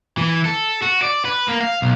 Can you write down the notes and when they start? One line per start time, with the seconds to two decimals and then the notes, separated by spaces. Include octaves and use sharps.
0.18 E3
0.46 A4
0.82 F#4
1.03 D5
1.25 B4
1.48 A#3
1.61 F5
1.82 B1